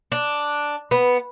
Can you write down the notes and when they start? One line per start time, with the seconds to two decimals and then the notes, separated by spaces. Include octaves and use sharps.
0.12 D4
0.91 B3